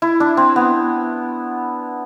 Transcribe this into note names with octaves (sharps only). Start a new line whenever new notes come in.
E4
D4
C4
B3